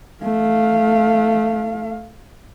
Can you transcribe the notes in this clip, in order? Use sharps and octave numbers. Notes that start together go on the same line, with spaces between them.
A3 F5